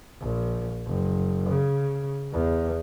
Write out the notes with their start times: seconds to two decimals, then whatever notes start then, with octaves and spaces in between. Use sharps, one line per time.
0.21 A#1
0.86 F#1
1.50 C#3
2.33 E2